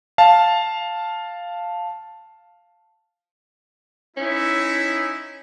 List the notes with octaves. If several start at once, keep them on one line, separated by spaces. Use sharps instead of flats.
F5 A5
C#4 D#4 E4